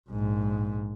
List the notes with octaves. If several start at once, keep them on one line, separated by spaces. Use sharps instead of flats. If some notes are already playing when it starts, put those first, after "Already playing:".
A#1 G#2